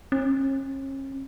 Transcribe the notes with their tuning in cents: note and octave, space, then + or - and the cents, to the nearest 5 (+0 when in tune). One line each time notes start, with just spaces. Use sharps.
C#4 -40